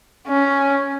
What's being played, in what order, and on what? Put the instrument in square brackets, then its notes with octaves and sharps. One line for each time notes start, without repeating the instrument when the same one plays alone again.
[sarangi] C#4